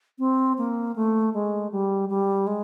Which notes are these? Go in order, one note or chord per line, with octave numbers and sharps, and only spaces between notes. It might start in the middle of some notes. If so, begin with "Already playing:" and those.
C4
A#3
A3
G#3
G3
G3
G#3